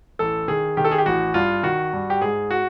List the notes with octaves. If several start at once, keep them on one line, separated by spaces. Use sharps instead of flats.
A1 A4
D#3 G#4
D#3 G4
A4
G#4
G4
A1 F#4
G2 F4
D#3 F#4
G2
G4
G#2 G#4
F#4